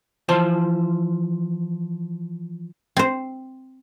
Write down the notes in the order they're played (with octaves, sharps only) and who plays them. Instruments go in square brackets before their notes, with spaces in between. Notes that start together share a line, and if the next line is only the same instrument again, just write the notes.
[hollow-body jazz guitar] E3 F3 C5 A5
[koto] C4 C5